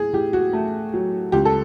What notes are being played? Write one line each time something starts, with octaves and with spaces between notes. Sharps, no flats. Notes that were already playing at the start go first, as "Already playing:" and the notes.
Already playing: A2 G#4
A2 G4
F#4
A3
F#3
C#2 G4
A4